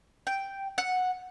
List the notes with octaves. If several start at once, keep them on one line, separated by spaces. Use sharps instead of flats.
G5
F#5